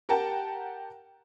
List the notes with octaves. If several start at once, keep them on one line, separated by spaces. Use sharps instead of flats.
G4 A#4 F#5 G5 A5